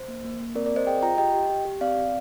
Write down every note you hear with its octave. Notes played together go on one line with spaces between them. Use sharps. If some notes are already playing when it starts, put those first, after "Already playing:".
Already playing: C5
A#3
A#3
A#3
C4 A#4 D5
A#4 D5
C4 C5 D#5
G#4 D#5 G5
F4 G5 A#5
G4 D#5 G5
G4
G4
G4
C4 D5 F5
C4